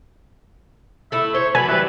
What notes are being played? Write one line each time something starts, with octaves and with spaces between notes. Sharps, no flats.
A3 E4 E5
C5 C#5
F#3 D4 B4 C#5 G#5 B5
E3 G3 B4